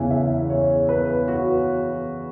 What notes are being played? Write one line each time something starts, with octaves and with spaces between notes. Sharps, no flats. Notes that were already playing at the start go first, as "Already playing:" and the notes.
Already playing: E2 C#3 E3 E5
E5
C#5
B4
F#4